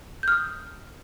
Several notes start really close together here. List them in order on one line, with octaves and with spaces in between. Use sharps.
G6 F6 D#6